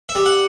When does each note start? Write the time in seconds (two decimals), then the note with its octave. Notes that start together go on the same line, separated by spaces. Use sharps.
0.09 E5
0.15 G3
0.26 F#5